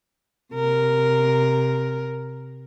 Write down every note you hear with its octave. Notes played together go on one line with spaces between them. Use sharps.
C3 A#4